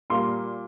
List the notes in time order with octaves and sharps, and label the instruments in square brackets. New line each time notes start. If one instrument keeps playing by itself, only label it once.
[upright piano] A#2 G3 A#3 C6